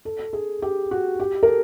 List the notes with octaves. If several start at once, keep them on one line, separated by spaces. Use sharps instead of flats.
A4
G#4
G4
F#4
G4
A#4
A4